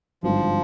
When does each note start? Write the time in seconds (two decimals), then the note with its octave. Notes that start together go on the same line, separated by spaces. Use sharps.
0.23 G#1 G2 D3 F3